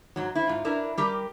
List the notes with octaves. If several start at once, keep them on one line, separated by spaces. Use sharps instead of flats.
G#2 F#3
E4 C5
G#2 F4
D4 E4 A#4 B4
G3 G4 A#4